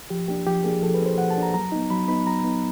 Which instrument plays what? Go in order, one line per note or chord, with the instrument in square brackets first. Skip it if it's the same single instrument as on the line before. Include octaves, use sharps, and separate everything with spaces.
[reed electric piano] F3 G4
A#3 D4 G4
F3 G4
A#3 D4 G#4
F3 A4
B4
A#3 D4
C5
F3 F#5
A5
A#3 D4
A#5
F#3 A#5
B3 D#4
F#3 B5
B3 D#4 B5
F#3 A#5
B3 D#4